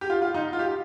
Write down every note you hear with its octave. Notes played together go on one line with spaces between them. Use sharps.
G4
F4
F4
D#4
F4
G4